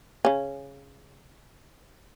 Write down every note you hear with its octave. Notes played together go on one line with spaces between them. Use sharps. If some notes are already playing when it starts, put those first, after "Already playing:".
C#3 C#4